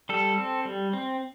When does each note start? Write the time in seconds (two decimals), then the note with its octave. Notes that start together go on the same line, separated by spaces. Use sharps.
0.09 G3 A4
0.37 C4
0.65 G3
0.93 C4